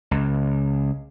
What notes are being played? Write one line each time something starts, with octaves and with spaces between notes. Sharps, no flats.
C#2